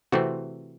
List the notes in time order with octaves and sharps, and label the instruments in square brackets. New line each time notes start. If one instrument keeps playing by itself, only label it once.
[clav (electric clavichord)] C3 E3 A3 C4 F#4